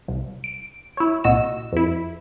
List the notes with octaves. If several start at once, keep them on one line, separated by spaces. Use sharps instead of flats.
C2
D7
E4 C#5
C2 A#2 F#4 D#5 E6 E7
F2 E4